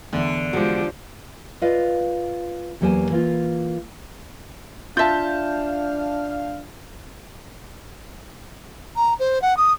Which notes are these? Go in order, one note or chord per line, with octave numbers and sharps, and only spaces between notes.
E2 D3
F3 G#3 F#4 G4
F4 B4 D5 D#5 F5
E2 F#3 A#3 G4 C5 G#5
E3 A#3 F4
D4 F4 E5 F5 A5 G6
A#5
C5
F#5
D#6